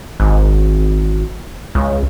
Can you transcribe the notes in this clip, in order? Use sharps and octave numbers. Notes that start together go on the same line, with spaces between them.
G#1
C#2